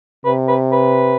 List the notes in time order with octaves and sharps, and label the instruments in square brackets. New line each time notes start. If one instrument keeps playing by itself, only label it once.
[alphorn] C3 [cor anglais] B4
[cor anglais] B4
B4